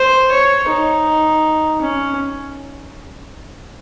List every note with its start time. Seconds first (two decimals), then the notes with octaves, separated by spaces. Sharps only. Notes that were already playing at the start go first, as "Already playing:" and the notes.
Already playing: C5
0.31 C#5
0.69 D#4
1.82 C#4